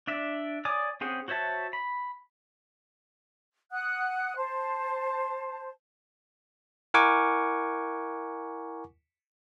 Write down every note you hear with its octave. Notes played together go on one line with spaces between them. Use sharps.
D4 D5 E5
C#5 D5 G#5 D6 D#6
C4 C#4 G#4 C5 F#5
F#4 C5 C#5 E5 A5
B5
F#5 D#6 F#6
C5 A5
E4 A#4 F#5 G#5 C#6 D6